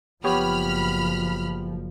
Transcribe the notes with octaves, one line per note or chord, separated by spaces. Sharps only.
F#1 F3 B3 G4 C#5 B5 F6